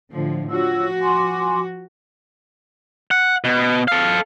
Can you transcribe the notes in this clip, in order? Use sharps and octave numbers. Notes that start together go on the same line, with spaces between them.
A2 D3 F3
F3 F4 F#4 C#5 E6
G#5 C6 D6
F#5
B2
A4 F5